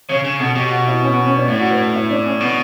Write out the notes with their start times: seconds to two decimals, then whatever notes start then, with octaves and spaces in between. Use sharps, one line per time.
0.09 C#3 C#5
0.24 C#3
0.40 B2 A4
0.55 B2 G4
0.71 F#4
0.86 E4
1.02 C#4
1.13 B3
1.25 C#4
1.37 D4
1.48 A2 E4
1.60 F#4
1.70 B4
1.82 A4
1.94 E4
2.10 D4
2.25 C#4
2.41 B2 B3